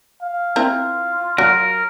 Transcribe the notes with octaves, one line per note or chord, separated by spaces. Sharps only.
F5
C4 E4 F4 A#4
F#3 A#4